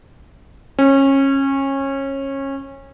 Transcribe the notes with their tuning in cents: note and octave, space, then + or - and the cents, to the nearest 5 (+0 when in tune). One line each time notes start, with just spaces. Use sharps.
C#4 -25